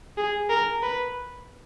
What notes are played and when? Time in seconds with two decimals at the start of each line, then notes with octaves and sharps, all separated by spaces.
0.18 G#4
0.50 A#4
0.83 B4